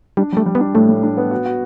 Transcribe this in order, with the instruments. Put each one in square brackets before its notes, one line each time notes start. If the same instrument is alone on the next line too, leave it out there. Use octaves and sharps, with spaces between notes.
[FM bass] G3 [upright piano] D4
[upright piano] G3 [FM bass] A3
[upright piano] G3
[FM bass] B3
[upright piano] D4
[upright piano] A2 [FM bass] A3
[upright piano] A2
D4
B3
F#4
F#4